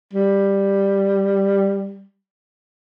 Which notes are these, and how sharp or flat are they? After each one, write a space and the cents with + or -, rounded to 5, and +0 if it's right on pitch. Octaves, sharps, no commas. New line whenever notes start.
G3 +5